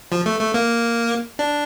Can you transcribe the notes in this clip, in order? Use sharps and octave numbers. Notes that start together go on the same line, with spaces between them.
F3
A3
A3
A#3
D4